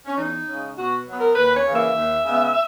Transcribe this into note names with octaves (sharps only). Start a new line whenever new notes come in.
C#4
E2 D#4
C#3 G#3 C#4
B2 F#4
F#3 B3
A#4
D#2 B4
C#5
C#3 E3 A#3
E5
D#2
C#3 G#3 B3